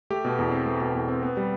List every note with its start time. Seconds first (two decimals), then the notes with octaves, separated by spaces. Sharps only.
0.10 A3 G4
0.25 B2
0.39 E2
0.52 C4
0.66 A3
0.81 B2
0.95 E2
1.08 C4
1.23 B3
1.37 G3